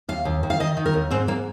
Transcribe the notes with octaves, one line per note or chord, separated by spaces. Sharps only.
D#2 F5
D#2
D#3
F5
D#3 D#5
D#3
A#4
D#2
G#2 C4
G#2 A#3